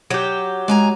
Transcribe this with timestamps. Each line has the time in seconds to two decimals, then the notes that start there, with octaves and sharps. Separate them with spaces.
0.10 F#3 G4
0.68 G#3 G#5 A#5